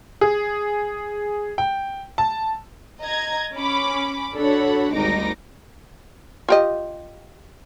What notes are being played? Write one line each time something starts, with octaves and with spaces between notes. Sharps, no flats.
G#4
G5
A5
D#5 A#5 G#6
C#4 B5 D6
D4 F#4 A4 C#5 F#5 B5
G#1 D2 G3 D#4 D6 A#6
F4 G4 D#5